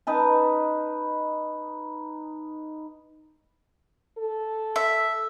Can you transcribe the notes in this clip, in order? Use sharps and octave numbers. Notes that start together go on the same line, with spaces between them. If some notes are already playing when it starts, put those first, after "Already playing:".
D#4 B4 A5
A4
E5